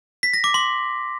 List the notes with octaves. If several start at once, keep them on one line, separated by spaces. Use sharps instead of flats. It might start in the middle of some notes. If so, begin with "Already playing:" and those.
B6
A#6
D6
C6